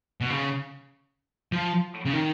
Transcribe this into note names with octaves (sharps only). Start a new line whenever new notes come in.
B2
C#3
F3
C#3
D#3